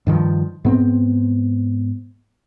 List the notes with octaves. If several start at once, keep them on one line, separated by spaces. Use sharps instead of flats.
G2 D#3 F3
G#2 B3 C4